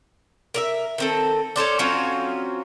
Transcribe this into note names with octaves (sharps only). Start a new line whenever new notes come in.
A#4 D5 E5
D#3 C4 A4
C#4 A4 C5 D5
F#3 C4 C#4 F4